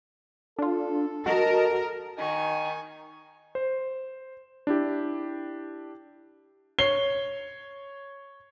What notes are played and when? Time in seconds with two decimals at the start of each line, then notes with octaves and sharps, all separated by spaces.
0.59 D4 F4 A4
1.26 F#4 A#4 D#5 A5
2.18 D#3 D#4 G#5 C#6
3.55 C5
4.67 D4 E4 G4
6.79 C#5 C7 G7